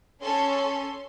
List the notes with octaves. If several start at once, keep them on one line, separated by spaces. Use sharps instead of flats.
C#4 A4 C6
C6